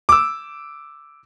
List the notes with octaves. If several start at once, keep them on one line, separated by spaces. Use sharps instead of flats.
D6 E6